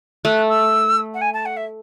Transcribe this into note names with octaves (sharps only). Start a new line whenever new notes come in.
A3 F#6
E6
F#5
G#5
A5
F#5
E5